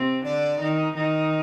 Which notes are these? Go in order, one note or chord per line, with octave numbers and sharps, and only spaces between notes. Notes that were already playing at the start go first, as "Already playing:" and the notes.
Already playing: C3 C4
D3 D4 D5
D#3 D#4
D#3 D#4